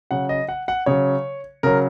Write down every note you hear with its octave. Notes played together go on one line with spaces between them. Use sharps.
C#3 F#3 F#5
D#5
F#5
F#5
C#3 F#3 C#5
C#3 F#3 A#4